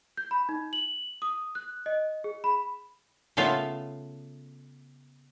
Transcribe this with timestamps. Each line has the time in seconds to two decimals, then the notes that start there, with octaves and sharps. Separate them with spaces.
0.17 G6
0.31 B5
0.49 D#4
0.73 F#7
1.22 D#6
1.55 F#6
1.86 D#5
2.24 G#4
2.44 B5
3.37 C#3 A3 B3 F4